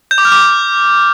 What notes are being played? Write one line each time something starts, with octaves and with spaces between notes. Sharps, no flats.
G6
D6
F6
D6